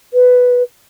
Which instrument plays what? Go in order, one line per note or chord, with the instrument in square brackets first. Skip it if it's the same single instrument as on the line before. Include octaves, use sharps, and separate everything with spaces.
[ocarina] B4